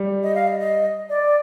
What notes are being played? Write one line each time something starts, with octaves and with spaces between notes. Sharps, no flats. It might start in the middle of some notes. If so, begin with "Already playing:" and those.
Already playing: G3
D#5
F5
D#5
D#5
D5